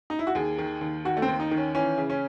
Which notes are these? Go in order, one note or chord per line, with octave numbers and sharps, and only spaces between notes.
D#4
E4
F#4
D#2 G#4
D#3
D#2
D#3 F#4
A3
C4
D#2
D#4
D#3
C#4
E3 C#4
C#3
C#4